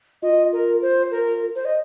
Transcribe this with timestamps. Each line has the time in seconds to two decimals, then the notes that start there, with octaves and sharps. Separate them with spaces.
0.22 F4 D#5
0.53 A#4
0.82 C5
1.11 A#4
1.56 C5
1.65 D#5